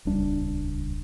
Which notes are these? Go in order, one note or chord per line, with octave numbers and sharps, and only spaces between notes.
D#1 C#2 G3 D4